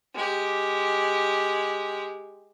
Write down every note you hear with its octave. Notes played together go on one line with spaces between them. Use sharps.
G#3 G4